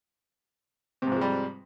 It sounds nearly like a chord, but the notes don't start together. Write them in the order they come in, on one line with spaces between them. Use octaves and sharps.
C3 G#2 F3 G#3 G3